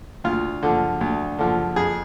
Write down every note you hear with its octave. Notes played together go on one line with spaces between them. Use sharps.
D2 F4
D3 F3
D2
D3 F3
F2 G#4